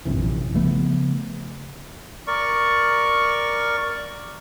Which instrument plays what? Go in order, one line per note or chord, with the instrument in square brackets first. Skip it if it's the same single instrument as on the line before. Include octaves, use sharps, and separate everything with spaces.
[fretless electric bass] A#1 F#2 C3 E3
C#3 F3 A3 B3
[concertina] A#4 D5 C#6